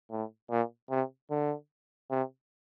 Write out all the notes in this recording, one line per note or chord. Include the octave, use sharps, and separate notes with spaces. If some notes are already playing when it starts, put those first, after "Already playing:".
A2
A#2
C3
D3
C3